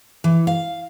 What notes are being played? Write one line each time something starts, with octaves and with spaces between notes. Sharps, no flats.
E3
F5